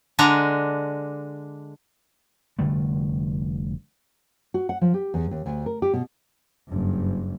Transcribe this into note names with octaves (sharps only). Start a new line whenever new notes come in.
D3 G#3 D4 A#5
F1 D3 G3 A3
F#4
F#5
F3
G4
E2
D#2
D2
A#4
G4
B2
F#1 G2